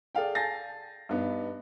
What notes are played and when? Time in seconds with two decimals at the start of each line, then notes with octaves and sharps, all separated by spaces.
0.15 G#4 A4 D5 F5 G5
0.35 G#5 A5 G6 A6 A#6 C7
1.09 G2 B3 D#4